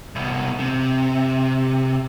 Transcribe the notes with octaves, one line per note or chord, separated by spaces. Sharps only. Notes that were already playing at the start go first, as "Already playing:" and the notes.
C2 B2
C3